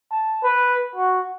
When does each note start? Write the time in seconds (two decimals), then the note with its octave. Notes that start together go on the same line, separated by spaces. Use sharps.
0.11 A5
0.44 B4
0.96 F#4